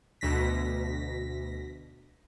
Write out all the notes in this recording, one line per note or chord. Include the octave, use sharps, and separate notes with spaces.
D2 B2 A#6 B6